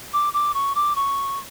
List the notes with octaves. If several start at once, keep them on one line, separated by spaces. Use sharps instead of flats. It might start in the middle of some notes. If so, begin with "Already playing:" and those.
D6
D6
C#6
D6
C#6